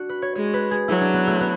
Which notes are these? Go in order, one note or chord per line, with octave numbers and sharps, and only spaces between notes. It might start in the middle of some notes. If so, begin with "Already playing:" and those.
Already playing: D4 F#4
B4
C#5
G#3 C#5
B4
G#4
F#3 E4
D4
B3
A3
B3